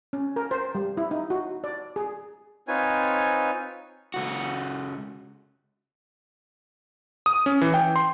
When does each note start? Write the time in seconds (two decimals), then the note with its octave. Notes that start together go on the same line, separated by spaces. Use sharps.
0.13 C#4
0.36 A#4
0.51 C5
0.75 G3
0.97 E4
1.11 D#4
1.30 F#4
1.64 D5
1.96 G#4
2.68 C4 D#4 F4 B4 C#5 G#5
4.14 C#2 F#4
7.26 D#6
7.46 C#4
7.61 E3
7.74 G5
7.96 C6